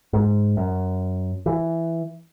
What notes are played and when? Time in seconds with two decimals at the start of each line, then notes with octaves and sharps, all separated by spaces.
0.13 G#2
0.57 F#2
1.46 E3